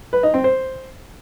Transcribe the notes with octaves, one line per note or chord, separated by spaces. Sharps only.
B4
D#4
C4
C5